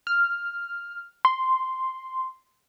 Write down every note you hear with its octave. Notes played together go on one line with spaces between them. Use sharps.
F6
C6